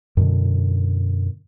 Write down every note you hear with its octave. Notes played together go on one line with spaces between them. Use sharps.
F#2 B2 D3